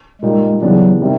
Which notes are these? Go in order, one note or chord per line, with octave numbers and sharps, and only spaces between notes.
A#2 G3 G#3 A#3 D#4
C#3 E3 F#3 G3 B3 D4
C3 D#3 G3 C4